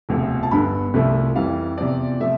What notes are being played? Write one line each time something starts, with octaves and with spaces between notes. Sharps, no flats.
E1 D2 C3 F3
A5
G1 G2 D3 B5
C2 C3 F3 A3
F2 E3 G3 F5
E2 C3 F3 D5
C3 F3 A3 E5